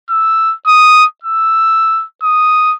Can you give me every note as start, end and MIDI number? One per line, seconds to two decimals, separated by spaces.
0.10 0.54 88
0.67 1.05 87
1.24 2.05 88
2.23 2.75 87